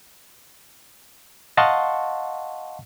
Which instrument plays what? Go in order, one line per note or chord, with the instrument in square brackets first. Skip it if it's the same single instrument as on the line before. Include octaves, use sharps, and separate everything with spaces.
[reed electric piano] D#5 F5 F#5 A5 C6 C#6